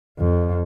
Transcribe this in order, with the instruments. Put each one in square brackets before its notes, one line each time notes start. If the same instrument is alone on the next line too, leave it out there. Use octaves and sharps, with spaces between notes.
[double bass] F2